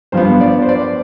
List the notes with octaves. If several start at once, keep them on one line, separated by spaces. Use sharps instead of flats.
G2 F3 B3 C5
D5
C5
D5